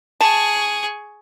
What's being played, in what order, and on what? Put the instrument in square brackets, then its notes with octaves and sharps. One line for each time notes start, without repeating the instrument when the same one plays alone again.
[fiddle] G#4 C#6 [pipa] A5